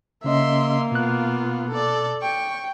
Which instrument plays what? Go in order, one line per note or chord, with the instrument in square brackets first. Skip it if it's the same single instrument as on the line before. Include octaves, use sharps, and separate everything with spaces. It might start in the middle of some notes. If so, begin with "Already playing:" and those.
[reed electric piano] C#3 C#4 D#5 [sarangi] A#3 [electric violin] E5 C6
[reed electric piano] B2 F#6 [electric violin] B3 F4
[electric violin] A4 D5
[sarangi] G5 [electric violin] C#6